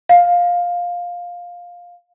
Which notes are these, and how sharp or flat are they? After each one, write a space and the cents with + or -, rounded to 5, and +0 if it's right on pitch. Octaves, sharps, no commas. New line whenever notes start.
F5 +10